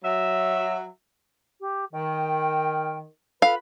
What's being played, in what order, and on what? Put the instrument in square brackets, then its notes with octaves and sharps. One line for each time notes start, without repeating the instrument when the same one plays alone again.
[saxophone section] F#3 E5
[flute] G4
[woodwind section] D#3 [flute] G5
[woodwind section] F4 B4 B5 [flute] A4 [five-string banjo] F5